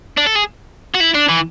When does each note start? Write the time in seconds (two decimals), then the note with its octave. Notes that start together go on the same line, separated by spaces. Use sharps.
0.18 D4
0.27 A4
0.36 G#4
0.95 F#4
1.01 E4
1.15 D4
1.29 E3